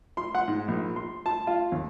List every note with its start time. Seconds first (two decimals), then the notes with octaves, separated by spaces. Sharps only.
0.17 C6
0.35 F#5
0.48 G#2
0.68 A#1
0.96 C6
1.26 A5
1.47 F4
1.72 D#2